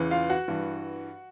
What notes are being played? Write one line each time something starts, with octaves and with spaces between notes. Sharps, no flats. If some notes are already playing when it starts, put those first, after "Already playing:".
Already playing: E2 C#3 E3
F4 F5
F#4 F#5
G2 E3